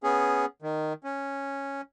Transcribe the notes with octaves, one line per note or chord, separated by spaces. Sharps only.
B3 C#4 G#4
D#3
C#4